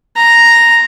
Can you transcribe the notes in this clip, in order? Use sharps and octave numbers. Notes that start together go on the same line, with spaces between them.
A#5